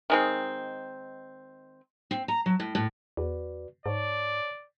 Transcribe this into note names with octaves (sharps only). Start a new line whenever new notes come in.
D#3 G#3 C4
C4
A#5
F#3
A2
A2
E2 F#4 B4 D5
G#2 C#5 D5 A5